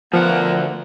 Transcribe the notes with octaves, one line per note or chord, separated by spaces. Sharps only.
D2 F3 B3 A#4 F#5